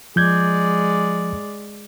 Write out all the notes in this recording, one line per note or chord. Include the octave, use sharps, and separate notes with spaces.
F3 G#3 D5 G6 G#6